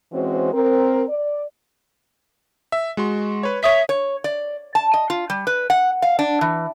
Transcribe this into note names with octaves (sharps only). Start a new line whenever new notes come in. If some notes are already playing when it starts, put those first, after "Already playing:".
E3 G#3 C4 C#4 F#4 C5
C4 A#4
D5
E5
G#3 F#4 C6
B4 C#5
C#5 E5 D#6 B6
C#5
D5
A5
D#5
F4
G3
B4
F#5
F5
D4
E3